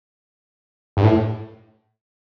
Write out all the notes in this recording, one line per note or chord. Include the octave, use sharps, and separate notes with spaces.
G2
A2